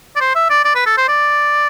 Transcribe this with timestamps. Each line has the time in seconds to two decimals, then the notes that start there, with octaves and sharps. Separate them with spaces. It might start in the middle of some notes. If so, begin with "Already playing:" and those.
0.16 D5
0.21 C5
0.35 E5
0.50 D5
0.65 D5
0.75 B4
0.86 A4
0.97 C5
1.08 D5